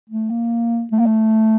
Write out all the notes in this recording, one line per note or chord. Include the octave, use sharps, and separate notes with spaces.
A3
A#3
A3
A#3
A3